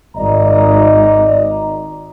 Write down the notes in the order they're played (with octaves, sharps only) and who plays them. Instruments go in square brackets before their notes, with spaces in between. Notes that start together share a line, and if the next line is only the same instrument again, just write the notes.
[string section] G#1 [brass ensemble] D5 D#5 A#5